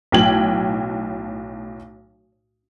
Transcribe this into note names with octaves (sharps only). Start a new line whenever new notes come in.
B1 A2 G5 G#6 F#7